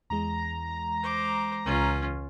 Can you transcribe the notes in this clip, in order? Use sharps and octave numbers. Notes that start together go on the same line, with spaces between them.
E2 E3 G#3 A#5
C5 D6
C#2 C#4 F4